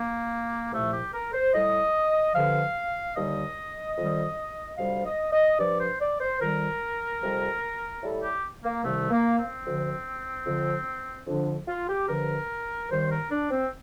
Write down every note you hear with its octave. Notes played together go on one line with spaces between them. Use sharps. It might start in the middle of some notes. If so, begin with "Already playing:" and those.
Already playing: A#3
C2 A#2 F3 A3
G4
A#4
C5
A2 G3 D#5
G2 D3 F3 F5
D#2 D3 G3 D#5
F2 D#3 G3
D2 C3 G3 F5
D#5
D#5
G2 F3 D5
C5
D5
C5
F2 D#3 G3 A#4
F2 C3 G3
A2 G3 A4
G4
A#3
C2 C3 D#3 G3 A3
A#3
C4
D2 D3 F3
F2 D3 F3
F2 D3 F3 D4
F4
G4
G2 D3 F3 A#4
D#2 D#3 G3 C5
A#4
D4
C4